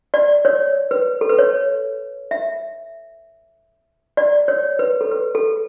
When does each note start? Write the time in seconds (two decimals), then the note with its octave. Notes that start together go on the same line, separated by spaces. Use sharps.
0.14 D5
0.45 C#5
0.91 B4
1.21 A4
1.29 B4
1.39 C#5
2.31 E5
4.17 D5
4.48 C#5
4.79 B4
5.01 A4
5.11 B4
5.35 A4